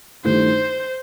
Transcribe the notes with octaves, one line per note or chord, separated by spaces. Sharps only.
G2 D#3 A3 E4 C5